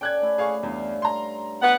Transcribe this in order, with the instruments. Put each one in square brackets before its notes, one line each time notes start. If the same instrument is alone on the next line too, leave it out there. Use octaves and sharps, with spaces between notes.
[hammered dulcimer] C#4 A4 D5 [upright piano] G5 F#6 G#6
[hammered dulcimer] A3 E4
[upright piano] G#4 F5 C#6
[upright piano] E2 [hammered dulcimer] G2 F5
[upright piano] A#5 C6
[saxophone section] B3 F#5